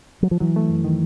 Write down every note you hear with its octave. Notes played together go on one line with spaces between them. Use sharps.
F#3
F3
E3 F#3
A3
F#2
D#3